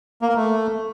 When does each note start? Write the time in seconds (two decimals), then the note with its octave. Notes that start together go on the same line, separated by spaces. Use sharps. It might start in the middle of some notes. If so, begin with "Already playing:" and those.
0.22 A#3
0.29 A#4
0.36 A3